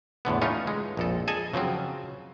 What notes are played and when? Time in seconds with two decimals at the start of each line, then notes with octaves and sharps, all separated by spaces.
0.25 E2 A2 D3 B3
0.42 E3 A3 C#4 D#4 F4 C#5
0.67 G#3
0.97 A#1 F2 A4
1.28 G#4 A4 D#5 G#5 A5
1.53 C#3 F3 F#3 C4